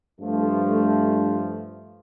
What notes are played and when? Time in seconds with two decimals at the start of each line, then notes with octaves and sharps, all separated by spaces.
0.19 G2 F3 A3